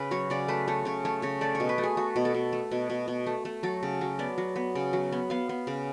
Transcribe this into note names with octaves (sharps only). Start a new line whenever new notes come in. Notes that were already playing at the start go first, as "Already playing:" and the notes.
Already playing: C#3 B4
F#3 C#5
C#3 D5
A3 B4
A3 C#5
C#3 C#5
A3 C#5
C#3 C#5
A3 D5
C#5
B2
B4
A3
G#4
A3 F#4
B2
A4
B2
A3
B2
B2
B2
A3
A3
F#3 A4
C#3
F#3
B3 D5
F#3
B3
C#3
F#3
B3
B3 F5
B3
C#3